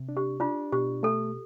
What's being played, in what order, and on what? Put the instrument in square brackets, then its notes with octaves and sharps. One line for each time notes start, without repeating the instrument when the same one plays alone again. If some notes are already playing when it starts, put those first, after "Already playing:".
Already playing: [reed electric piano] C3
D4
[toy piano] G4
[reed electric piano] D4 [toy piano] F4
[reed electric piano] B2 [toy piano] G4
[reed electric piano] A3 [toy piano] A4